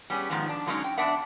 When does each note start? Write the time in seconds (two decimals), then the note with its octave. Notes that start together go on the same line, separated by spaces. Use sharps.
0.10 G3 B3 C#4 G#4
0.30 G#2 D#3 F3 G#3 B3 D#4
0.49 D4
0.66 D3 F#3 G#3 A#3 C#4 D#4
0.84 G5
0.98 B3 D4 D5 E5 F#5